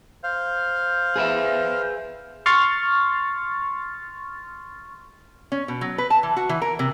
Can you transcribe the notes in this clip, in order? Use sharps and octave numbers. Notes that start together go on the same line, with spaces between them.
C5 F5
G#4 B4 E5
C6 C#6 F6 A6
C#4
B2
F#3
B4
A5
E3
F#4
E3
A#4
C3